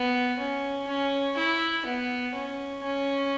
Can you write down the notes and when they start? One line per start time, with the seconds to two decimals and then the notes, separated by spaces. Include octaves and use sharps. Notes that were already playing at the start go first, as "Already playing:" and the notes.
Already playing: B3
0.39 C#4
0.88 C#4
1.37 E4
1.86 B3
2.35 C#4
2.84 C#4